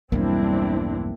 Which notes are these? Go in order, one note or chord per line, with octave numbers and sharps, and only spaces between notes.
B1 E2 G2 G3 A#3 C4 D4 E4